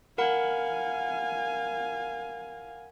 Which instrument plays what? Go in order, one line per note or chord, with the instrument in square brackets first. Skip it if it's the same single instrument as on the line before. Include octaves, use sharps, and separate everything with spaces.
[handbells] A#4 F#5 B5 [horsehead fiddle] F5 G#5